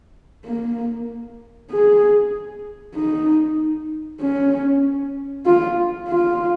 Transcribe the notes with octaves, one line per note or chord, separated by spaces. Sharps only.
A#3
G#4
D#4
C#4
F4
F4